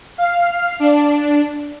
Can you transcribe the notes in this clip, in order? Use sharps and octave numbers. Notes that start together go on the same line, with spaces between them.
F5
D4